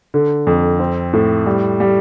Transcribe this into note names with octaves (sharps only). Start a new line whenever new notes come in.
D3
F2
C4
A2
G3
G3